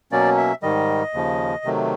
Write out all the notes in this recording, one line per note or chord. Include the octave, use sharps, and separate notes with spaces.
B2 F#3 A#3 C#4 D5
E5
G#2 D#3 G3 D#5
D#2 C#3 F3
C3 D#3 F#3 A3